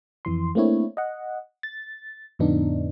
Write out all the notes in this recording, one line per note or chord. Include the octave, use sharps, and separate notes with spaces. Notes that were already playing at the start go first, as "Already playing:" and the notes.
F2 E3 C6
A3 A#3 C4 D4 E4 C#5
D#5 F#5
A6
F2 A2 D3 B3 D4 D#4